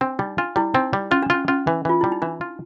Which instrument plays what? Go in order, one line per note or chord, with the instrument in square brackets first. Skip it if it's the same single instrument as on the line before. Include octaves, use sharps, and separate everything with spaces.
[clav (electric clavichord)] C4 [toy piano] D4
[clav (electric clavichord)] G3 [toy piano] D#4
[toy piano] D4 [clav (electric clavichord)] F4
[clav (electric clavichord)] G3 [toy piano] E4
[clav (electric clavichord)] C4 [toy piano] D#4
[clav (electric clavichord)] G3
[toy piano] C#4 [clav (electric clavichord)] F4
[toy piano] D4
[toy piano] C#4 [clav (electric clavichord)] F4
[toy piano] C#4 [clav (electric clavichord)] F4
[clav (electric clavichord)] E3
[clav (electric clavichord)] E3 [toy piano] F4
[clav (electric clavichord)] G3 [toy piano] E4
[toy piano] D#4
[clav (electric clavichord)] E3 [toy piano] D4
[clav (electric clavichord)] F4